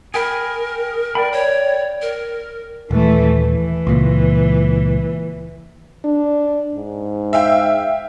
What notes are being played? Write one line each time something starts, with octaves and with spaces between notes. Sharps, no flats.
G#4 A#4 G5 B5
D5 G5 B5
C#5
A#4
D#1 E3 A3
E3
C#2 A#2
D4
G#2
E5 F5 G5